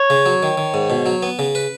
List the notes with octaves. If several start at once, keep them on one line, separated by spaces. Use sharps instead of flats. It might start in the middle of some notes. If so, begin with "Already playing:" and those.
Already playing: C#5
C#3
F#3
D#3
D#3
G#2
B2
F#3
B3
C#3
B4